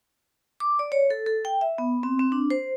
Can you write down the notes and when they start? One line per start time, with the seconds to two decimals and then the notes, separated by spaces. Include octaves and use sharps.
0.60 D6
0.79 D5
0.92 C#5
1.10 A4
1.26 A4
1.45 G5
1.61 E5
1.78 B3
2.03 C4
2.19 C4
2.32 D4
2.50 C5